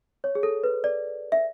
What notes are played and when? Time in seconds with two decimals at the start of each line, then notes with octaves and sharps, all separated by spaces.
0.24 C#5
0.35 G#4
0.43 A4
0.64 B4
0.84 D5
1.32 E5